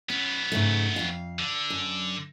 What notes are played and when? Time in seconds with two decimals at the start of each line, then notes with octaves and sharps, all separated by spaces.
0.10 F#2 B3 C#4
0.52 G#2 C#3 A3
0.96 F2 F5
1.39 D3
1.70 F#2